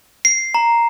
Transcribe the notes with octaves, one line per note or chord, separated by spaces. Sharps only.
C7
A#5